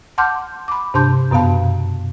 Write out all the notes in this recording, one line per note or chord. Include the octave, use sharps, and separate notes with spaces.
F#5 A5 C6 D6 F6 G6
B5 D6
G2 C3 D4 A5 C6 G6
F#2 B2 B3 F5 A5